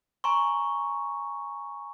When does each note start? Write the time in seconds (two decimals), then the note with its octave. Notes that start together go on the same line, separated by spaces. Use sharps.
0.24 G#5 A#5 C6 C#6